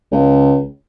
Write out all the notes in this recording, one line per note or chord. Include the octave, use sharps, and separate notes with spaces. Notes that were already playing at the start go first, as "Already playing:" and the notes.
C#2